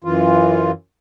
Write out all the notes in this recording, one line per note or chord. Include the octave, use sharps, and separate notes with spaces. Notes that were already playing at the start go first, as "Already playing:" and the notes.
F#2 E3 F4